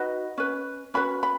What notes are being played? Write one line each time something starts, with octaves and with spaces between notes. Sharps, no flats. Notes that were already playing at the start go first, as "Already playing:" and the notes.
Already playing: D#4 F#4 B4 D#5
C#4 B4
C#4 F#4 B4 B5
B5